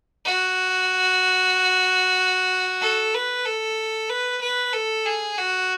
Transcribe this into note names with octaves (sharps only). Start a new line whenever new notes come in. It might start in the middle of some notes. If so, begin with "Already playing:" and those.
F#4
A4
B4
A4
B4
B4
A4
G#4
F#4